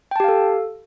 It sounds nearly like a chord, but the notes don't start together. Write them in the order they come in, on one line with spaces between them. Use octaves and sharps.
G5 A5 G4 F5 A4